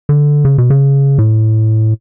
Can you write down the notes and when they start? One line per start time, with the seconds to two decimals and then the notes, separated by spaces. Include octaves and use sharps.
0.09 D3
0.45 C#3
0.58 B2
0.70 C#3
1.18 A2